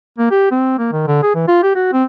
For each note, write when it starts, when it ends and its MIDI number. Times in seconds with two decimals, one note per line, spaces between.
0.18 0.29 58
0.31 0.50 67
0.51 0.74 60
0.79 0.92 58
0.92 1.06 51
1.07 1.19 50
1.22 1.34 68
1.35 1.44 52
1.48 1.59 65
1.63 1.73 67
1.75 1.88 66
1.93 2.04 60